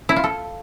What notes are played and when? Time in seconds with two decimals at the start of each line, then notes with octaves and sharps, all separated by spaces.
0.09 E4
0.16 F4
0.24 A4